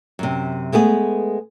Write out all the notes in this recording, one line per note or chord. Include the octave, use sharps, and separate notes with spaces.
F#2 C3
G#3 A3 B3 G4 G#4